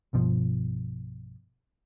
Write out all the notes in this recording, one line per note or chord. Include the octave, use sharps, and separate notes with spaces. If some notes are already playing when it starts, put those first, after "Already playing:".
B1 G2 B2 F3